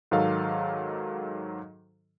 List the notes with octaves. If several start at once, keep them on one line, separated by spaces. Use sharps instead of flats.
G#2 D#3 F#3 A4 F5